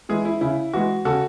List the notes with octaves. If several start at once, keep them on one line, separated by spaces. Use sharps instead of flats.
E3 G#3 E4 G#4
E4
C#3 E4
E3 G#3 F#4
C#3 F#4 A4